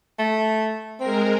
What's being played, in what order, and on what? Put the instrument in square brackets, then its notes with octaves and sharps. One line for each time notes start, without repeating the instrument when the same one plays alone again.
[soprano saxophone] A3
[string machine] G#3 A#4 [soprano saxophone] C4